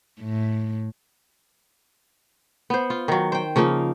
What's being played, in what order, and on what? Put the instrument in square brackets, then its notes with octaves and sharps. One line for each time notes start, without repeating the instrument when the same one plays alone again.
[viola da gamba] A2
[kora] B3 C5
F4
D#3 F#3
C5 G5
C#3 F3 A#3 D#4